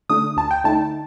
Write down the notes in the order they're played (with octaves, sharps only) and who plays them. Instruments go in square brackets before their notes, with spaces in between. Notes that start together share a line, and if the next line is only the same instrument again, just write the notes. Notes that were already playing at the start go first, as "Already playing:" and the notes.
[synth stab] D3 A3 D4 D#6
D2 A5
G5
D3 A3 D#4 A5